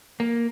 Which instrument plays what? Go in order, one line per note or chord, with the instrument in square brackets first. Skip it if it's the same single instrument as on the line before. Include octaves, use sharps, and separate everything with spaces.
[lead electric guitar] A#3